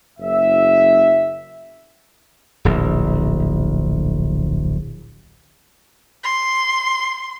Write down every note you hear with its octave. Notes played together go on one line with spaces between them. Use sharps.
F#1 E5
D1 A#1
C6